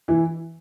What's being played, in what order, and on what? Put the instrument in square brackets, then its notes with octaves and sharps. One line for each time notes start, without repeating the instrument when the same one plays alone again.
[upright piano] E3 E4